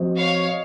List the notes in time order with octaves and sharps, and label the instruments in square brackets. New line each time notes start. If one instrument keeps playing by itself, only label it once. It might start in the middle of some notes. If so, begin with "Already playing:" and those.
Already playing: [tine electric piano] F3 C4 F#4 C5 D#5
[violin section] C#5 F5
[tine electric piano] D#5